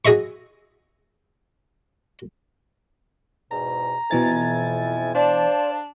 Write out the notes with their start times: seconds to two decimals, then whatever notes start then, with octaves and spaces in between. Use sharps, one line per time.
0.05 F#4 G#4 D#5 E5 C#6
3.51 E2 G#2 B2 A#5
4.11 F2 B2 E3 E4 G#5 A6
5.15 D4 C5 D5 F5 A5